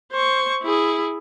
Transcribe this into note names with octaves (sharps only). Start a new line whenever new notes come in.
C5 C#6
E4 G#4